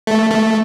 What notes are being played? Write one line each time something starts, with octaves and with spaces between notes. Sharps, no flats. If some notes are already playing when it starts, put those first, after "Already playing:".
A3
A3